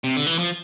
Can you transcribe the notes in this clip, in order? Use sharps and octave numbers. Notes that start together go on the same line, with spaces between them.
C3
D3
E3
F3